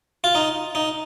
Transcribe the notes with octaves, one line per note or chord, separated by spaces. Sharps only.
F4
D#4
D#4